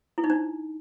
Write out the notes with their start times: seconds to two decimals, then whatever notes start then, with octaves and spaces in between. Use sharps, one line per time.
0.18 E4
0.24 D#4
0.30 D4